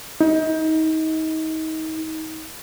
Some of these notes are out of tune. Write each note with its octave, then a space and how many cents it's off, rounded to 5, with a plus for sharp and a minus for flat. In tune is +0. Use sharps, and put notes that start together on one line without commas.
D#4 +30